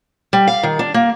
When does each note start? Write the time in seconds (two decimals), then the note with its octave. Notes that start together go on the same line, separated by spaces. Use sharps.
0.33 G3
0.48 F5
0.63 D#3
0.79 D4
0.94 A#3